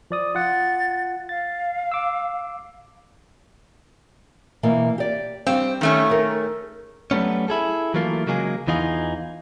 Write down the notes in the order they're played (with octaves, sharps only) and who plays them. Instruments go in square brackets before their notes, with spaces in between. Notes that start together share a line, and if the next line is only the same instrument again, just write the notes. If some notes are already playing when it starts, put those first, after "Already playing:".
[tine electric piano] F3 D5 D#6
[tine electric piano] F4 F#5 [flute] A6
[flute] F5 [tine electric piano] A6
[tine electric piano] D6 E6
[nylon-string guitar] B2 E3 A#3
G4 D5
[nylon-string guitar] G3 F5 [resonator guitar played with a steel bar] C4
[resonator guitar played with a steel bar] D#3 A3 C#4
[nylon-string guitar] G#4 A#4
[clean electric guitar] F#3 G3 A3 B3 C#4
E4 G#4 A4
E3 F#3 A3 A#3 F4
C#3 F#3 G#3 A#3 G#4
E2 E3 D#4 F4 G#4